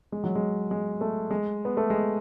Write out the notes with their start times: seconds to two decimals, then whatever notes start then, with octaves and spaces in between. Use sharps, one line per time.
0.12 G#3
0.24 F#3
0.35 G#3
0.71 G#3
1.01 A3
1.31 G#3
1.65 B3
1.77 A3
1.90 G#3